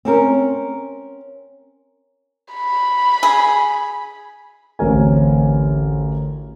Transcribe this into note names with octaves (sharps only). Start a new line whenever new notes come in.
C4 C#4 A#4
B5
G#4
A1 D2 C4 A#4 C#5 G#5